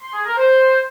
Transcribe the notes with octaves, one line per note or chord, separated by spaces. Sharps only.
C6
G#4
A#4
C5